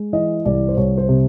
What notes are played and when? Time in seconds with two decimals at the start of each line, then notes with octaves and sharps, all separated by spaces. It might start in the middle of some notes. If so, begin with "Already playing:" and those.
Already playing: G#3
0.13 E3 D#5
0.45 C2 D5
0.68 C5
0.77 C2 C#5
0.98 C5
1.08 C3